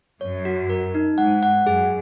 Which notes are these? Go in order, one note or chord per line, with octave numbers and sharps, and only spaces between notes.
F#2 C#5
F#4
A#4
D#4
G#2 F#5
F#5
F#2 G#4